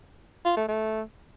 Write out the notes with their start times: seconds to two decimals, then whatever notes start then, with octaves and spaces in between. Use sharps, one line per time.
0.45 F4
0.57 A3
0.68 A3